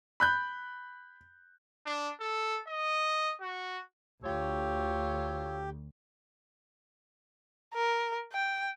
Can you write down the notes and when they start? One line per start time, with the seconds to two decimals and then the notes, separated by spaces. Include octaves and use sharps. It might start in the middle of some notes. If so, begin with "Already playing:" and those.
0.20 B5 F#6 G6
1.86 D4
2.20 A4
2.68 D#5
3.41 F#4
4.23 D2 F4 G4 A4 C#5
7.75 A#4
8.33 G5